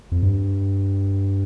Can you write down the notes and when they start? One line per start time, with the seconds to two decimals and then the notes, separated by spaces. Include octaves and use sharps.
0.12 F2
0.23 G2